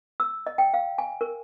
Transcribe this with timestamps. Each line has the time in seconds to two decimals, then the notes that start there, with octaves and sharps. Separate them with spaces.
0.20 E6
0.47 D#5
0.58 G5
0.74 F5
0.98 G#5
1.21 A#4